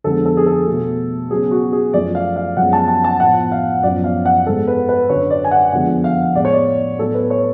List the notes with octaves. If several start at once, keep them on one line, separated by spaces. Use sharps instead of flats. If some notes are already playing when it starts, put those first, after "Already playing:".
F2 D3 G#3 B3 A4
A4
G#4
A4
B2 A3
C#3 F#3 B3 G#4
F#4
G#4
F#2 F3 A3 D5
F5
F5
F#2 F3 G#3 B3 F#5
A5
A5
A5
A2 F3 B3 F#5
F5
F#2 F3 B3 D5
F5
F#5
G#2 G#3 B3 A4
B4
B4
F#2 D3 F#3 C#5
D5
G#5
F#5
F2 D3 F3 G#3 B3 F#5
F5
A2 G#3 B3 D5
C#5
D5
A2 F#3 B3 A4
B4
C#5